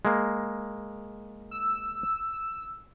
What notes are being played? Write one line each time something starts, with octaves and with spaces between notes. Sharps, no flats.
G#3 A#3
E6